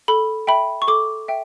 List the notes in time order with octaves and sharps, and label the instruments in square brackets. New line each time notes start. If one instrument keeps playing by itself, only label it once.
[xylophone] A4 B5
E5 G5 B5
C#6
A4 D6
E5 G5